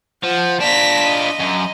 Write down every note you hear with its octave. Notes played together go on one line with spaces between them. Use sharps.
F3 F#5
D4 F4 A#6 B6
D#5
F#2